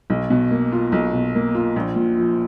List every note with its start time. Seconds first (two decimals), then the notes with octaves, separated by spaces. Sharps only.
0.10 B1
0.30 B2
0.51 A#3
0.72 F4
0.92 B1
1.13 B2
1.35 A#3
1.55 F4
1.76 A#1
1.96 A#2
2.18 F3